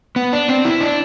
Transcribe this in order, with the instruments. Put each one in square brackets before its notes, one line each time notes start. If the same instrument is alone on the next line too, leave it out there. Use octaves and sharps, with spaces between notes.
[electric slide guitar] B3
D4
C4
E4
D4